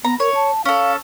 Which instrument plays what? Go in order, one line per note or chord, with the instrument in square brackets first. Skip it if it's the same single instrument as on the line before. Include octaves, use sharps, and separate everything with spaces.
[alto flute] B3 [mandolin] A#5
[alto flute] A#4 [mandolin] C#5
[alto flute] A5
[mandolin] C#4 A4 [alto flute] F5